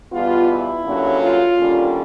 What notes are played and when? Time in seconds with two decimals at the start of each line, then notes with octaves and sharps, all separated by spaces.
0.13 E2 B2 G3 B3 F4
0.48 E4
0.85 G2 D3 F#3 A#3 C#4
1.22 F4
1.58 D#2 D3 G3 A#3 C#4